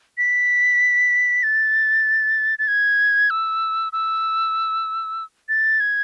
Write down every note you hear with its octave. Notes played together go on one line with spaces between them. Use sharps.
B6
A6
A6
G#6
E6
E6
A6
G#6